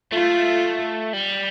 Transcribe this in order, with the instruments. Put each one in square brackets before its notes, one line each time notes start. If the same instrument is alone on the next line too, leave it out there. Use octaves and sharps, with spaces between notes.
[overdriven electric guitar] A3 [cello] F4
[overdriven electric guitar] G3